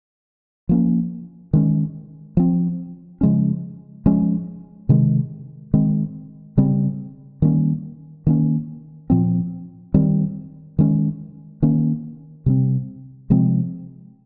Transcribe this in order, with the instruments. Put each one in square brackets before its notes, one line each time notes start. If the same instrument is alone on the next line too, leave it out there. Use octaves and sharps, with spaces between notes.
[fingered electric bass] F3 A#3 C#4
D#3 G#3 C#4
F3 C4
C#3 F3 G#3 C#4
F3 G#3 C#4
C3 D#3 G#3
D#3 G#3 C4
C#3 G3 C4
D#3 G3 A#3 C#4
D#3 A#3 C#4
A#2 F3 C4
D#3 G3 C4
D#3 G#3 C#4
D#3 A#3 C#4
C3 G3 C4
C3 F3 G#3 C4